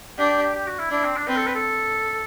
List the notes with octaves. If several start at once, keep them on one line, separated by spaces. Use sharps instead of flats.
D4 G4
G4
G4
G4
F#4
E4
D4 E4
C4
D4
C4 B4
A4
B4
A4